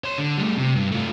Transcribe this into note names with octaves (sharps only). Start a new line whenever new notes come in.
C#5 C6
D3
G3 A3
C3
G2
A3 F4